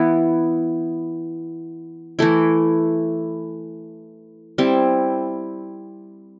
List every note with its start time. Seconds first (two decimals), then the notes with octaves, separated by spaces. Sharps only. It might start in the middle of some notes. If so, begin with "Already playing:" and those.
Already playing: E3 B3 E4
2.19 E3 A3 E4
4.58 G3 C4 E4